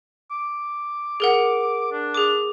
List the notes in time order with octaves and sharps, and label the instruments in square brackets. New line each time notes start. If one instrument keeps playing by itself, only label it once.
[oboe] D6
[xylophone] G#4 A#4 F#5
[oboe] D4
[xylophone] G#4 D6